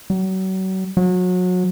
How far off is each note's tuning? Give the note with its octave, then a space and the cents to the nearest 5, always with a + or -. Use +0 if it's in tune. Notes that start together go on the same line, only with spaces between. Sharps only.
F#3 +35
F#3 -30